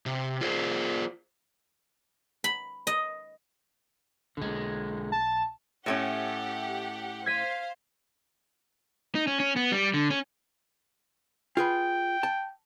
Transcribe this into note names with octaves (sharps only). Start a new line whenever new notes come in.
C3
F4 G#4 C5
B5
D#5
B1 B2 D3 G#3
A5
A2 A3 C#4 G4 F#5
C5 F5 G#6 B6 D#7
D#4
C#4
C#4
B3
G3
D3
C#4
F4 G#4 B4 G5
A5